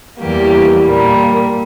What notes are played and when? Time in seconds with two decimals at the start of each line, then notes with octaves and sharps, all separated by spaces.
0.19 E2 E3 G3 A#3 G4
0.83 A#2 G3 A#3